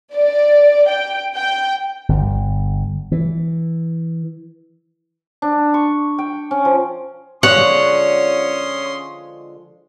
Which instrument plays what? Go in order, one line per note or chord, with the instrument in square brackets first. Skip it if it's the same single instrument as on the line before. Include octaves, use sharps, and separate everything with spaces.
[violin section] D5
G5
G5
[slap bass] G1
E3
[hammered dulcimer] D4
C#6
G5
C#4
F3
[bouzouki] D3 F3 G#3 [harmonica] C#4 C6 D#6 [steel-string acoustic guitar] C#5 [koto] F#5